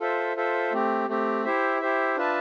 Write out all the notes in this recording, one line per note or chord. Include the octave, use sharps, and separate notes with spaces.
F4 A4 C5 E5
F4 A4 C5 E5
A3 C4 G4
A3 C4 G4
E4 G4 C5 E5
E4 G4 C5 E5
D4 F4 B4 E5 A5